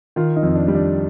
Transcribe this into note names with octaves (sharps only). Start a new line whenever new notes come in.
D#3 F4
D#4
F2
D4
G3
D4